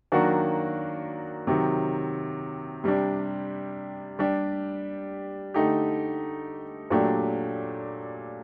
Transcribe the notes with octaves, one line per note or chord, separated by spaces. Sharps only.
D#3 F#3 A#3 D4 F#4
C3 D#3 F#3
C3 G3 D4
G3 D4 G4
D3 A3 D#4 G4
A#2 F#3 A3 D4 G4